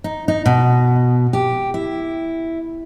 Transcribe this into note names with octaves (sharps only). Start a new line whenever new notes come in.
D#4
D#4
B2
G4
E4